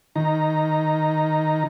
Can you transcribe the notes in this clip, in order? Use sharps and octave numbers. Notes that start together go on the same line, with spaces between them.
D#3 D#4 A#5